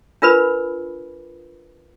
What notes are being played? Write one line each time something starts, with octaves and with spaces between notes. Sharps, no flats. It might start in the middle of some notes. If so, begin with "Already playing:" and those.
D4 F4 A#4 B4 B5